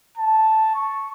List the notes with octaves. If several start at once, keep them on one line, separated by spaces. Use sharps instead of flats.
A5
C#6